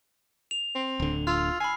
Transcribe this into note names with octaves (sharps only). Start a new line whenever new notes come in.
F7
C4
D1 D3
F4 E6 F6
G#5 B5 C7